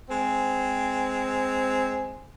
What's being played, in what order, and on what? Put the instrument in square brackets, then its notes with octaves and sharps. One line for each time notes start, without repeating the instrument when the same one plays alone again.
[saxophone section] G#3 C4